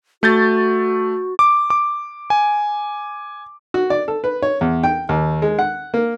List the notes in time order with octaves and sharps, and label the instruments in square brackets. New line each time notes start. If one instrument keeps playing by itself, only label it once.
[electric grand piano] A3 G6 A6 [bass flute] F#4
[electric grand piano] D6
D6
G#5
[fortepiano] F#4
D5
A4
B4
C#5
E2
G5
D#2
G#3
F#5
A#3